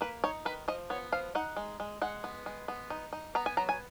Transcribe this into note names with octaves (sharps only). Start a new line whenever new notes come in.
A#3 B4
D#4 C#5
D#3 B4
F3 D#5
B3 C#5
F3 F5
D#4 F#5
G#3
G#3
G#3 F#5
B3
G#3
B3
D#4
D#4
B3 A#5
G#5
F#3 A#5
G#5